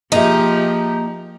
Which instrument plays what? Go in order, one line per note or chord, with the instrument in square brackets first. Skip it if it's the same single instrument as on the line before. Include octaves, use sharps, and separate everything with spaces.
[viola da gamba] F3 G4 [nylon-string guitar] A#3 G#4 E5 [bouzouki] D#4